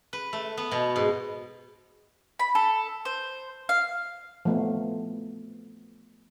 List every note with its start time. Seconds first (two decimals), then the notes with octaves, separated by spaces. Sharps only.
0.13 B4
0.33 A3
0.57 B3
0.71 B2
0.96 G#2
2.39 B5
2.55 A4
3.05 C5
3.69 F5
4.45 F3 A3 B3